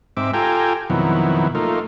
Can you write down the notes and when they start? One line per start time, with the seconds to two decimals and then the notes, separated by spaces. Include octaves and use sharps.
0.17 G#2 C4 E5 D6
0.34 F4 G4 A4 G5 G#5 A#5
0.90 F2 B2 D#3 F#3 E4
1.55 A3 A#3 D#4 F4